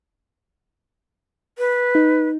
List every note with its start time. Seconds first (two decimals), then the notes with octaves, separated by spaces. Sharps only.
1.58 B4
1.95 D#4